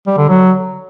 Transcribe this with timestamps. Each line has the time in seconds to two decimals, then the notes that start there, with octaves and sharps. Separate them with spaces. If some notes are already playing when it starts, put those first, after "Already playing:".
0.07 G3
0.18 D3
0.29 F#3